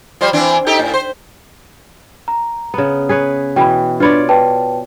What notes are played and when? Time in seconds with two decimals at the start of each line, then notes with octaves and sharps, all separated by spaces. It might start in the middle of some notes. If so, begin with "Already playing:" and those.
0.21 F3 G3 C5
0.33 E3 C4 D4
0.66 D#4 G4 A4
0.79 A2
0.94 C5
2.28 A#5
2.74 C#3 B3
3.09 G#4 B4 C#5
3.56 B2 E3 G5 B5
4.00 D4 F4 B4 C#5 D5 B5
4.29 B4 G5 A5